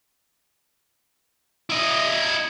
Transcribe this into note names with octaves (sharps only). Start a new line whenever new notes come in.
E4 D#5